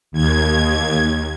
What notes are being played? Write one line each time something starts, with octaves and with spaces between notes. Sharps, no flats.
D#2 G#6